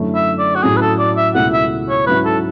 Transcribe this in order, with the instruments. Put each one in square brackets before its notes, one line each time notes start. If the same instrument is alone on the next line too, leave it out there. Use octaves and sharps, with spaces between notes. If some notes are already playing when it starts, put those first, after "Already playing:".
Already playing: [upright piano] F#2 D3 A3 C#4 E4
[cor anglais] E5
D5
F#4
[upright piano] A2 F#3 C#4 [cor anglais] G#4
[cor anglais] B4
A4
D5
E5
[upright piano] C#2 B2 A3 E4 [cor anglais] F#5
[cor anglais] E5
C#5
[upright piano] G#2 F#3 C#4 E4 [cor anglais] B4
[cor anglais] A4